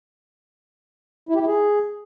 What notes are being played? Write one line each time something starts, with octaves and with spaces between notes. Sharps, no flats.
E4
G4
E4
G#4